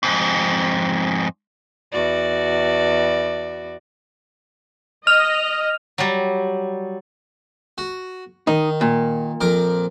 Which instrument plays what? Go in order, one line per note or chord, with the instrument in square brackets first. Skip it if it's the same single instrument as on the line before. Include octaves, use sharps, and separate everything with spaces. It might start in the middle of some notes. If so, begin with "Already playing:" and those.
[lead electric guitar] F2 G#2
[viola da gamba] E2 F#4 D5
[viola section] D#5 [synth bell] F6 F7
[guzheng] F#3 G3
[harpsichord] F#4
[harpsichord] D#3 [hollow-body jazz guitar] D#4
[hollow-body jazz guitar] A#2
[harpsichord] F2 A#4 D6